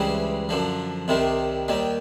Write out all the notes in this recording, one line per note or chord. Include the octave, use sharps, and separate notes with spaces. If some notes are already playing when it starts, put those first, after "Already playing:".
Already playing: C#2 C#3 E3 G3 C4
F#2 D3 F3
C2 C3 D#3 G3
D#2 D#3 G3